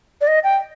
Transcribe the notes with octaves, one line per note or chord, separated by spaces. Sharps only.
D5
D#5
G5